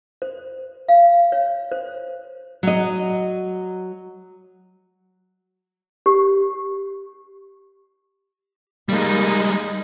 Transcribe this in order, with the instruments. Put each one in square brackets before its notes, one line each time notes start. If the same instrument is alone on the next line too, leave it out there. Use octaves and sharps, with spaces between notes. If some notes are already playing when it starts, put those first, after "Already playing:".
[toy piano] C5
F5
C#5
C5
[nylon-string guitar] F#3 D#5
[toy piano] G4
[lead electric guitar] G3 G#3 [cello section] A#3 D#4